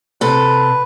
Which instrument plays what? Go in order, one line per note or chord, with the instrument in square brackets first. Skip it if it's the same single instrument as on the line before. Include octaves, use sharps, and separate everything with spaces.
[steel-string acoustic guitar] C3 A4 [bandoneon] B4